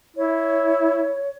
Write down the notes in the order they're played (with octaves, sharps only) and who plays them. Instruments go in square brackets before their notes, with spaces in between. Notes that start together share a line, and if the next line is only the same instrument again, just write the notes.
[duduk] E4 [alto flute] C#5